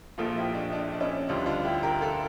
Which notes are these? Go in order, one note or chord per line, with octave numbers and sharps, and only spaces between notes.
A#1 A#2 F3 F4 A4
E4 G4
D4
D4
D4
C#4 E4
D2 D3 G3 D4 F4
D4 F4
E4 G4
G4 A#4
F4 A4